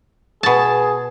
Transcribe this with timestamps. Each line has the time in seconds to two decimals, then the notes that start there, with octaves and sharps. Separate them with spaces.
0.43 B2 G#4 A5